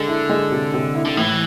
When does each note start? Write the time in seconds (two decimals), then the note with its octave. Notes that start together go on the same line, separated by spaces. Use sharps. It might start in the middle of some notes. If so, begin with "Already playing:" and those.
Already playing: D3 G#3
0.08 E4
0.30 G#3
0.52 C3
0.74 C3
0.95 E4
1.05 D3
1.17 A2 E3